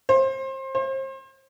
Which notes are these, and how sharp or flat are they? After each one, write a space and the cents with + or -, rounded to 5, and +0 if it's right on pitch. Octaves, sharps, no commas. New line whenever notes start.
C5 +25
C5 +35